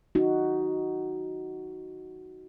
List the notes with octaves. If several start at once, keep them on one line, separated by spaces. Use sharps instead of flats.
D#4 F#4